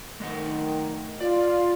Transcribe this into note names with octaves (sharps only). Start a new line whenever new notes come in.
D#3 A3 D#5 F#5
F4 D5